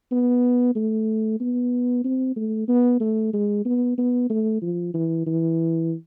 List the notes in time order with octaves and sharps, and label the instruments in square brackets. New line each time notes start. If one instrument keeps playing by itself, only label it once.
[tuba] B3
A3
B3
C4
A3
B3
A3
G#3
B3
B3
A3
F3
E3
E3